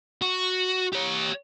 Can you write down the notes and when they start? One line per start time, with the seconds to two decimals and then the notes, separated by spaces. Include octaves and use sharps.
0.22 F#4
0.93 G4 C#5